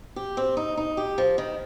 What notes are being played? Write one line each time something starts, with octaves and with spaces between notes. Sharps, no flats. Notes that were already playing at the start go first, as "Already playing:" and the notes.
G4
C4
D#4
D#4
G4
F3
D#3